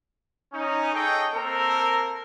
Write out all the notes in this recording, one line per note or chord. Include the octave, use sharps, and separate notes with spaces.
C#4 D#4
G#4 A4 C#5 D#5 G5
A#3 C4 A4 A#4